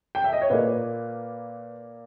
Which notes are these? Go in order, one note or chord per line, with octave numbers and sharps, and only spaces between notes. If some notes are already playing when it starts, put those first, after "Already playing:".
G5
E5
D#5
C#5
A#2 A#3 B4